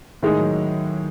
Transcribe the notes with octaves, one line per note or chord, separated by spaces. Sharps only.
A2 D#3 G#3 D#4 G#4
F#3